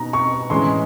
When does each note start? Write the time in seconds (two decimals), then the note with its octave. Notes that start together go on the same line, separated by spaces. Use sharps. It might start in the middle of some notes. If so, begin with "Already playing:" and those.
Already playing: B2 B3 D#4 A#5
0.13 C#6
0.50 A2 E3 G#3 C#4 C6